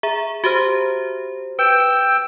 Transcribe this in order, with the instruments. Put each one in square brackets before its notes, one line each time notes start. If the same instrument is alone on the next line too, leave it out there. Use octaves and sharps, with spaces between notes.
[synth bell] G#4 E5 A#5
F#4 G4 C5
[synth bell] B4 [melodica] G5 E6